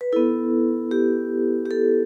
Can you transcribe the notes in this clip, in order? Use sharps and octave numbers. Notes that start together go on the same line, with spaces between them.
B4
B3 E4 A4
G4
G4
A4